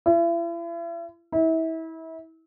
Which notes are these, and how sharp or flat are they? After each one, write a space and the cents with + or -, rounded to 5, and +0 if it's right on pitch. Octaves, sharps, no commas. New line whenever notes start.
E4 +40
E4 -30